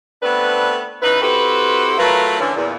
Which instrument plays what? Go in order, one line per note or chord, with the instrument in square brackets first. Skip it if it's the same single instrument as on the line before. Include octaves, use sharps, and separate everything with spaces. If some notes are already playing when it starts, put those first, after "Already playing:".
[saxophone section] A3 B3 C4 D4 B4
C#3 D#4 E4 B4
C4 E4 F#4 G4 A4 B4
F#3 A3 F4 A#4 B4
D3 E3 C#4
E2 A#2